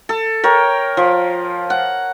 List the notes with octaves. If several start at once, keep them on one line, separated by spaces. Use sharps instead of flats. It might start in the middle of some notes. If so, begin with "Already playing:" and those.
A4
A#4 C#5 G5
F3
F#5